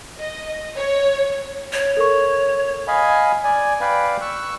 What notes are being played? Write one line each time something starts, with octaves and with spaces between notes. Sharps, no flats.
D#5
C#5
C#5
A4 A#4 C#6
D#5 F5 G#5 B5
D5 G#5
B4 D5 F5 G5 B5
C#6 E6 F#6